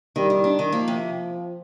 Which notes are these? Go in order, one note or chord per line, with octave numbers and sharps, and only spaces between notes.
D#3 G3
D#3
D4
D#3
F3 A#3
C3